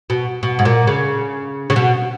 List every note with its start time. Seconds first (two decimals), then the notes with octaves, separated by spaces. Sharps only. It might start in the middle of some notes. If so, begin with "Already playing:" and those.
0.10 B2
0.43 B2
0.59 G#2
0.65 A#2
0.87 C#3
1.70 C#3
1.76 B2